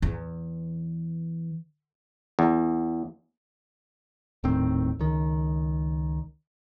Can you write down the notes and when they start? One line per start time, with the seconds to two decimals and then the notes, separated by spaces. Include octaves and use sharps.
0.02 E2 E3
2.39 E2
4.44 D#1 A2 D#3 C4
4.99 C#2 D#3